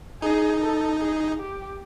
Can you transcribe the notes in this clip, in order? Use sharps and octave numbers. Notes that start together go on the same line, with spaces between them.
D#4 G#4
A4
G#4
G4